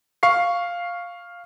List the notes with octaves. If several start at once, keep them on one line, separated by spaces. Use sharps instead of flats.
F5 C#6 C7